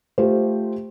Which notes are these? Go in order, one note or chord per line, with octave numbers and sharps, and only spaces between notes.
A3 F4 G4 C5